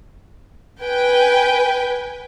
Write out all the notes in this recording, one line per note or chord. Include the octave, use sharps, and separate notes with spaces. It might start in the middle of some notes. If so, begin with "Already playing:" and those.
B4 G5 G#5